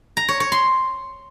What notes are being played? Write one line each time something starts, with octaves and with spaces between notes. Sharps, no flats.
A#5
C#5
C#5
C6